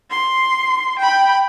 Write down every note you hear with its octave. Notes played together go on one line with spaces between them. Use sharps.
C6
G5 B5